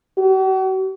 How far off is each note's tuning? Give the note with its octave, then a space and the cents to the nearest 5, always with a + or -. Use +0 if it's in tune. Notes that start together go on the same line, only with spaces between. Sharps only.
F#4 +45